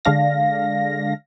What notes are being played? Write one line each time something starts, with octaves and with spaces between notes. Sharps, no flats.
D3 G#3 D4 F5 A#6